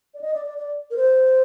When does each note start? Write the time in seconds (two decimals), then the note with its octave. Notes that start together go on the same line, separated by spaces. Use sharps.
0.14 D5
0.21 D#5
0.34 D5
0.46 D5
0.58 D5
0.91 A#4
0.96 C5